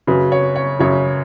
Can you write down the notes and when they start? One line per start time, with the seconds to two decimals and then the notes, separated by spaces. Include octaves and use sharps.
0.07 F#2 C#3 F#3 B4
0.32 C#5
0.56 C#5
0.79 F#2 C#3 F#3 C#5